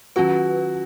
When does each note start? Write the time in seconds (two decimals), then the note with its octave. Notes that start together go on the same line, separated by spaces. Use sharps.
0.16 D#3 F#3 C#4 F4 F#4 B4